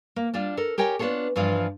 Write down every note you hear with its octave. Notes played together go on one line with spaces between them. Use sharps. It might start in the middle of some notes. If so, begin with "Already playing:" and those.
A#3
G3 D4 F4
A4 A#4
G4 A#4 C#5 G5 G#5
B3 D4 F4 A4 C#5
G2 E3 F3 F4